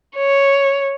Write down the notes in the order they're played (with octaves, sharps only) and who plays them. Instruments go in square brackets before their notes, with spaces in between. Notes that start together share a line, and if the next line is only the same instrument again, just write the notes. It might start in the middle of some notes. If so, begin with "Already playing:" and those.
[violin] C#5